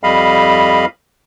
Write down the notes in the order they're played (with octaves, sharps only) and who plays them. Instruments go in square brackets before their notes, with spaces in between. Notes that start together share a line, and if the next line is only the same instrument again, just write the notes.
[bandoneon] F2 G3 D#5 F5 B5